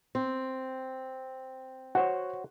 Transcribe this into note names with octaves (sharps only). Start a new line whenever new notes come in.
C4
F#4 C5 C#5 F#5